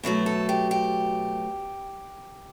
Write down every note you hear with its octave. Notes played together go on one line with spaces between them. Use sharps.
B2 F#3 A3 E4
A4
G4
G4